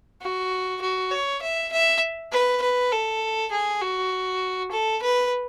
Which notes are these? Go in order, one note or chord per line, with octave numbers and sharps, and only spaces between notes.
F#4
F#4
C#5
E5
E5
B4
B4
A4
G#4
F#4
A4
B4